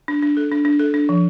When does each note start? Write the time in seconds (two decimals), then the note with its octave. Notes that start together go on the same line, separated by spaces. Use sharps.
0.08 D4
0.22 D4
0.37 A4
0.52 D4
0.65 D4
0.79 A4
0.94 D4
1.09 F3